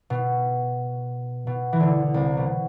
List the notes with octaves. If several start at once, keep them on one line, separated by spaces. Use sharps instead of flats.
B2
B2
E3
D2 D3
C2 C3
B2